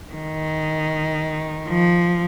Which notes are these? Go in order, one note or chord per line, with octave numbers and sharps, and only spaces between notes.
D#3
F3